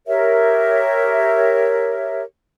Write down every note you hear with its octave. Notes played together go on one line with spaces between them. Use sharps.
G4 A#4 C#5 E5